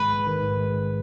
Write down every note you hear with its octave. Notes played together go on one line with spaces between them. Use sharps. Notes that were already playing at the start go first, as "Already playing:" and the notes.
Already playing: A#1 G#2 D#3 G#3 B4
A#1
D#3
G#2
G#3